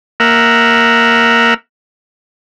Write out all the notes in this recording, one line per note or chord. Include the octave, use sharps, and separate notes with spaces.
A#3 A#4 E5 F#5